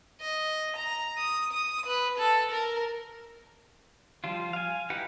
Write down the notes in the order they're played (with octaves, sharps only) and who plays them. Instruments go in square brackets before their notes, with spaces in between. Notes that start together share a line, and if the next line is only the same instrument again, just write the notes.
[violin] D#5
A#5
D#6
D#6
B4
A4
A#4
[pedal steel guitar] F3 G3 F4
F5 G#5
D#4 E4 G4 B4 F#5